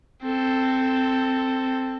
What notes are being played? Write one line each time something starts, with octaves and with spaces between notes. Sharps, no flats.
C4 A4